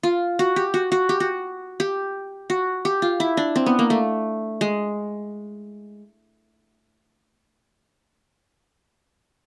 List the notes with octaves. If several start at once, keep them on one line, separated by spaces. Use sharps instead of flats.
F4
F#4
G4
F#4
F#4
G4
F#4
G4
F#4
G4
F4
E4
D4
C4
B3
A#3
A3
G#3